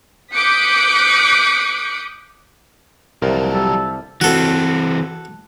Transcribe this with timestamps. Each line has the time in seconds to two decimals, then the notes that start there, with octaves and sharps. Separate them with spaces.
0.34 D6 D#6 F#6 G6 B6 C#7
3.22 C2 F3 F#3 A#4
3.54 G3 A4
4.21 E3 C4 F#4 A4